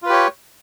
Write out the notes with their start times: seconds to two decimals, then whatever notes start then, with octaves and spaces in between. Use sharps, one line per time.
0.02 F4
0.06 B4
0.09 G4
0.12 C#5